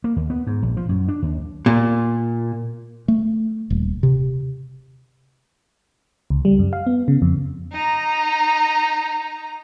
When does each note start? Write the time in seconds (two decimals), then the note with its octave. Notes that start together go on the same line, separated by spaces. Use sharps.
0.04 A#3
0.16 D#2
0.30 B3
0.47 G#2
0.62 A#1
0.77 F3
0.89 F#2
1.08 D4
1.22 D#2
1.66 A#2
3.08 A3
3.70 D#1
4.03 C3
6.30 C#2
6.45 G3
6.59 F#2
6.73 F5
6.87 B3
7.08 C#3
7.22 F2
7.72 D#4 A#5